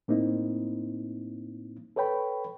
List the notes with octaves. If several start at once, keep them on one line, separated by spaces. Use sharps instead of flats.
A2 A#3 C4 D#4 E4
A4 B4 C#5 G5 B5